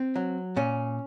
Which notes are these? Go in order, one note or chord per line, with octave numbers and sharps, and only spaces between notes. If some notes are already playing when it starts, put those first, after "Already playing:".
Already playing: C4
F#3
A#2 C#4